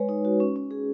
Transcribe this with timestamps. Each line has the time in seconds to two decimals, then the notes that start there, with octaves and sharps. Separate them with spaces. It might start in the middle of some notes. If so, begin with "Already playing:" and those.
Already playing: G#3 B4 C#5
0.09 D#4
0.25 F#4
0.40 C#4
0.56 C#4
0.71 G#4